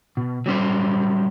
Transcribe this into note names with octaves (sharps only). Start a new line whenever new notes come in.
B2
F#3 G3 C#4 C5